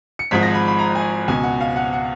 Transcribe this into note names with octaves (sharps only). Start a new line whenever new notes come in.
C#7
G#1 G#2 F3 B6
A#6
B5
B5
A#5
G#5
C#2 B2 G#5
F#5
F5
F#5
F#5